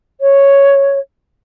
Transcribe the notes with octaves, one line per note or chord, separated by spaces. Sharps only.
C#5